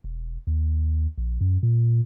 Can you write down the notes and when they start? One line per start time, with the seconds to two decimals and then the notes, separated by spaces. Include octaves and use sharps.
0.04 E1
0.47 D#2
1.18 A#1
1.41 F#2
1.63 A#2